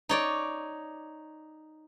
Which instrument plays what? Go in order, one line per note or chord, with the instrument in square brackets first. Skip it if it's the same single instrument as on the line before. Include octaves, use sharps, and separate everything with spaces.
[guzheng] D#4 C#5 D5